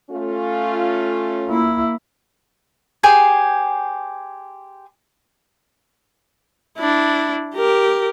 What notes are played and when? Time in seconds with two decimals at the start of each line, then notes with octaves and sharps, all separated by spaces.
0.11 A3 C#4 F4
1.48 A#3 E4
3.03 G4 G#4 C5 G#5
6.78 D4 E4
7.54 G4 A#4